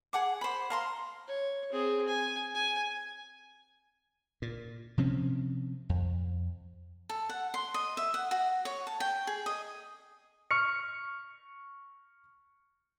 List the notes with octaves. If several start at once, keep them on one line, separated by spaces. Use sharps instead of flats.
G#4 F#5 D6
C5 B5
F5 A#5 C6
C#5
C4 G#4
G#5
G#5
A#2
C3 F3 C4 C#4
F2
A4
F#5
C6
D#5
E5
F#5
F#4
C#5
A5
G5
G#4
D#5
C#6 F6 C#7